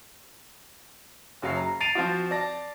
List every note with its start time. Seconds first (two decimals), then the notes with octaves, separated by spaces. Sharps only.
1.42 F#1 F#3 F5 C7
1.57 A#5
1.80 A6 C7 D7 D#7 F7
1.95 F3 C4 F4 F#4
2.31 D5 A5 A#6